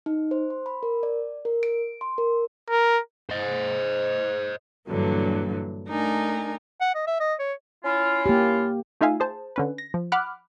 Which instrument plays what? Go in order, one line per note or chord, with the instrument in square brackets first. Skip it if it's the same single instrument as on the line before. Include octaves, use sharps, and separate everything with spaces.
[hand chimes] D#4
C5
C6
B5
A#4
D5
A#4
D7
C6
A#4
[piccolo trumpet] A#4
[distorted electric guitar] C5 D#5
[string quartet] G2 A#2 D3 E3 F#3
A3 D4 D#4 A#4 G#5
[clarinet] F#5
D#5
E5
D#5
C#5
[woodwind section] C#4 E4 F4
[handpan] A#3 G4
[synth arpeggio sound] A3 D#4 F4 E5 F5 G#5
G#4 C5 A5
D3 C#4 B4
A#6
F3
F#5 B5 D6 F6 F#6